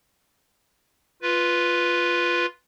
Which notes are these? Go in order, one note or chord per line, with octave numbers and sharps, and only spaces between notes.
F4 B4